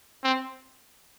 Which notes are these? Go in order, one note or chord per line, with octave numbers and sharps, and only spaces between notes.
C4